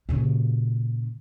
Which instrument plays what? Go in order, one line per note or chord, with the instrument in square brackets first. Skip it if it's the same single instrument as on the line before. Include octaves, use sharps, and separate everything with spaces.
[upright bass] A#2 C#3